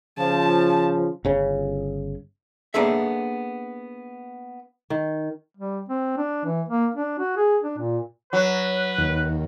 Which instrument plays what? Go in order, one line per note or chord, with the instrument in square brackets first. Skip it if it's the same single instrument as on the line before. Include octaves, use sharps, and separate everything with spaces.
[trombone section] C#3 F3 [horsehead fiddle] A5
[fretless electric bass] G1 C#3 C#4
[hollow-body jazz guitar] A#3 B3 D4 G#4 A4 E5
[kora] D#3
[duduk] G3
C4
D4
E3
A#3
D4
F#4
G#4
D4
A#2
[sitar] F#3 [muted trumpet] B4
[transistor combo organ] D#2